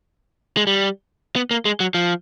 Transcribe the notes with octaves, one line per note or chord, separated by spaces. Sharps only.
G#3
G3
B3
A#3
G#3
F#3
F3